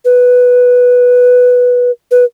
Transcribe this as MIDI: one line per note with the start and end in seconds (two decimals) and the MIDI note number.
0.05 1.91 71
2.11 2.25 71